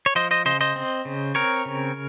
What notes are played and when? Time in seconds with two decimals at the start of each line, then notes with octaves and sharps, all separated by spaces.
0.06 C#5
0.15 F3 C5 D#5
0.31 C5 D#5
0.45 C#3 C5 D#5
0.61 C5 D#5
0.76 C4
1.05 C#3
1.35 C4 A#4 C#5
1.65 C#3